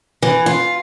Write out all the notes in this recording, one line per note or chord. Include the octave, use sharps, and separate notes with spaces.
E3
F4